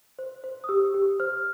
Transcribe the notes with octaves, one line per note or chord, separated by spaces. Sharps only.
C5
C5
D#6
G4 E6
G4
C5 F6